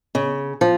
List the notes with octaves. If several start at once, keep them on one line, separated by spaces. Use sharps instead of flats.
C#3
F3